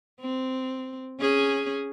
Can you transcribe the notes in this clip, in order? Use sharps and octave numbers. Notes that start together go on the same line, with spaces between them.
C4
C#4 G#4